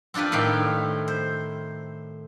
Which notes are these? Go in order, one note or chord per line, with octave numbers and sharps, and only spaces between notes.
C4 D4 F4 G4 B4
A2 D#3 E4 F5 G5
C5